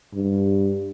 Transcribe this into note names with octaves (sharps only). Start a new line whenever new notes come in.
G2